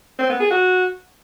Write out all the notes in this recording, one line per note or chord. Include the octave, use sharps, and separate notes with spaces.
C4
B3
G#4
F#4